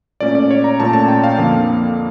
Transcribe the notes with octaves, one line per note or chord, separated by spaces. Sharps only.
A#2 A3 C#4 D5
D5
C#5
A#5
A#2 A3 C#4 A5
A5
G5
F5
F2 D3 F3 A#3